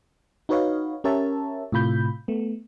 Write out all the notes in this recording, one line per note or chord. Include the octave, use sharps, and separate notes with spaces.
D#4 F#4 B4 C#5 D#5 F5
C#4 G4 A#4 C#5 E5 A5
A2 C3 F4 B5 G6
A3 B3